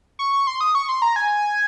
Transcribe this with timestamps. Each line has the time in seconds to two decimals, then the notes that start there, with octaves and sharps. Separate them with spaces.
0.19 C#6
0.33 C#6
0.47 C6
0.61 D#6
0.75 C#6
0.89 C6
1.02 A#5
1.16 G#5